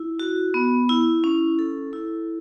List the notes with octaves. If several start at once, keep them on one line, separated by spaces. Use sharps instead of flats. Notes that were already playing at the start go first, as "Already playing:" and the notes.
Already playing: E4
F#4
B3
E4
C#4
A4
E4